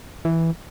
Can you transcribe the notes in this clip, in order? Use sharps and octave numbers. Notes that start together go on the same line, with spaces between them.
E3